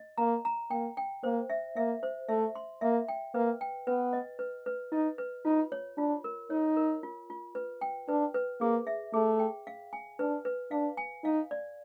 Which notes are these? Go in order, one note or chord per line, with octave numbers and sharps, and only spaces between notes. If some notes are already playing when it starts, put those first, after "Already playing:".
Already playing: D#5
A#3 A#5
A#5
A#3 G5
G5
A#3 C5
E5
A#3 E5
C5
A3 E5
C6
A#3 E5
G5
A#3 B4
G5
B3 B4
D#5
B4
B4
D#4 D#5
B4
D#4 F4
C#5
D4 F4
A#4
D#4 C#5
A#4
F4
F4
B4
G5
D4 B4
B4
A#3 G#4
E5
A3 G#4
G5
F5
G#5
D4 B4
B4
D4 F5
G#5
D#4 F5
D5